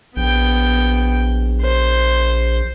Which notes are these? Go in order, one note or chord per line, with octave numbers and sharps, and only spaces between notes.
A#1 B3 G5
C5